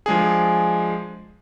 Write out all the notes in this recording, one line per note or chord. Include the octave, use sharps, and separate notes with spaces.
F3 G#3 D4 G#4